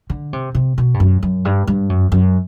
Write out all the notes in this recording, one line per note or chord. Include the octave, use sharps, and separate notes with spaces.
D3
C3
C3
B2
G2
F#2
F#2
G2
G2
F#2
F#2